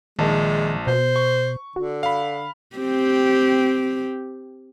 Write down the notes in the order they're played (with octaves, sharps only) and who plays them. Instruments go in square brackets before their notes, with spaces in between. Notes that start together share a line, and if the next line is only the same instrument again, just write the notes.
[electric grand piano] A#1 A5 [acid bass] D#3 [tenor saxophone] G#3
[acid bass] B2 [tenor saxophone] C5
[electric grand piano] C#6
[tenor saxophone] D3 [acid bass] F#4
[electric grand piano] F5 B5
[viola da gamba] C4 G4